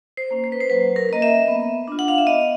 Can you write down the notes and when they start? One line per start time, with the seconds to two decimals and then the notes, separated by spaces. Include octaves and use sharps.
0.17 C5
0.31 A#3 C#4
0.44 C5
0.52 B4
0.61 C5
0.70 F#3 B4
0.96 A#4
1.09 A#3 C#4 D#5
1.22 E5
1.48 B3
1.88 D4 F4
1.99 F#5
2.08 F5
2.18 E5
2.27 B3 D#5